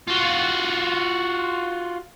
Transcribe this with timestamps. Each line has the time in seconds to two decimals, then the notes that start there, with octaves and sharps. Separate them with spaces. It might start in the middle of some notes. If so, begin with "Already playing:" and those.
0.07 F4 F#4